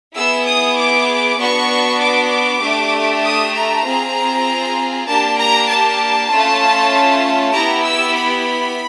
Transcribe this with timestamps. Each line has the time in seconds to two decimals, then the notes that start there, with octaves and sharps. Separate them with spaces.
0.16 B3 E4 G#4 E6
0.47 D#6
0.77 D6
1.39 B3 D4 F#4 C#6
2.01 D6
2.62 A3 D4 G4
3.24 D#6
3.54 A#5
3.85 C4 F4 G#4
5.07 A#3 D4 G4 A5
5.38 A#5
5.69 A5
6.31 A3 C#4 F4
7.53 B3 E4 G4 A#5
7.84 E6
8.15 B5